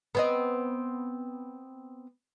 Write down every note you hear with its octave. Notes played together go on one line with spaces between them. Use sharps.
B3 C4 D#5